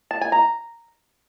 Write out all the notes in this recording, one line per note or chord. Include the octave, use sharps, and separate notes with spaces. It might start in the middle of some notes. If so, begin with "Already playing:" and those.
A5
G#5
A#5